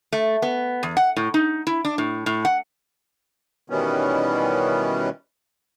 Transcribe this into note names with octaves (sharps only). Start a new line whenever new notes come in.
A3
B3
E2
F#5
A2
D#4
E4
D4
A2
A2
F#5
B2 D#3 E3 G3 B3 C#4